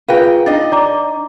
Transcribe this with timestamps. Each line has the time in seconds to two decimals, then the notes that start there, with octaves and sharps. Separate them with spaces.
0.08 F4 G#4 B4 F5 G5
0.46 D4 D#4 D#5 A6
0.72 D5 A#5 D6